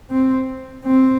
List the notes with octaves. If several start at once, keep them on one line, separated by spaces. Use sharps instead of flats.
C4
C4